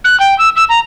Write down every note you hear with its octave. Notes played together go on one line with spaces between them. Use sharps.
F#6
G5
E6
E6
A#5